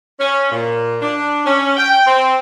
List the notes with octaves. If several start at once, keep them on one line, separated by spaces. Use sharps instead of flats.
C#4
A#2
D4
C#4
G5
C4